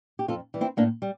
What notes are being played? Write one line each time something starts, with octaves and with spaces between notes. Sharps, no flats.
G4
F2 F4 A4
E3 G3
C4 E4
A2 A#3 D4
G3